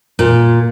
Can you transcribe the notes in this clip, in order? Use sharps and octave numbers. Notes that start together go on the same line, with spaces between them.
A#2